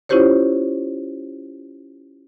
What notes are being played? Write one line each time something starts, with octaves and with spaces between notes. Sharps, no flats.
C#4 E4 F4 G4 C5 C#5